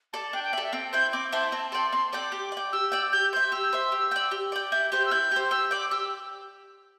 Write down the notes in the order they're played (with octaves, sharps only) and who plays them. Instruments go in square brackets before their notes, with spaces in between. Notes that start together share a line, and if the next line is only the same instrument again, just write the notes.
[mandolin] A4 D5 [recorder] A5
[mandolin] D4 [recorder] G5
[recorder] G5
[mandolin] D5 [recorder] E5
[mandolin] A4
[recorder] E5
[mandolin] C4 [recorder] G5
[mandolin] E4 C5 G5 [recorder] G6
[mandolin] C4 [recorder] D6
[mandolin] E4 C5 G5 [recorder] A5
[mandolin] C4 [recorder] A5
[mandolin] A4 D5 G5 [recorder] C6
[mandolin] C4 [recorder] C6
[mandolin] A4 D5 G5 [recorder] D6
[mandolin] G4
D5
G5
[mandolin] G4 [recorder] E6
[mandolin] D5 G5
[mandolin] G4 [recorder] G6
[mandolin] C5 E5 [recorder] G6
[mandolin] G4 [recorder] E6
[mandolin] C5 E5
G4
D5 G5
G4
D5 G5
[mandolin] E4 [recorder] G6
[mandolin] G4 C5 [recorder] G6
[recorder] E6
[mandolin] E4 [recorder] G6
[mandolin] G4 C5
[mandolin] G4 [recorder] E6
[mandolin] D5 G5 [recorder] D6
[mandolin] G4 [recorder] E6